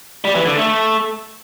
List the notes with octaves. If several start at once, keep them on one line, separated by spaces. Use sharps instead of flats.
G3
E3
D3
A3